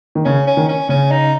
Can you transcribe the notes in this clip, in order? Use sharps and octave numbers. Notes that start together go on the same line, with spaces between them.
D#3
C#3 C#4
C#4
D#3
C#4
C#3 C#4
D#4